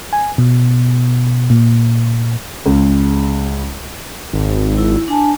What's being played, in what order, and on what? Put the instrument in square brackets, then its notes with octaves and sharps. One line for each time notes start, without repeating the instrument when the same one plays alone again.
[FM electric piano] G#5
B2
A#2
[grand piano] C#2
[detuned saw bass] G#1
[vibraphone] E4
D4 G#5 A5